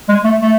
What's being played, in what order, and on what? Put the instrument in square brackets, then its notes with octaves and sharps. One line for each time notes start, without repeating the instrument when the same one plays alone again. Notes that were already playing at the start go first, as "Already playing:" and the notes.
[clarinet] G#3
A3
A3